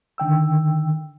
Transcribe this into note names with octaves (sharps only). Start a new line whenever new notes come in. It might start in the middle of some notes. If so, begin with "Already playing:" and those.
D3 D#3 G5 E6